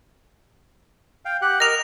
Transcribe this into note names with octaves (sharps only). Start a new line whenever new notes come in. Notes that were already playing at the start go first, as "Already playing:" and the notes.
F5 G5
G4 F#5 F#6
A#4 D#5 A#6 F7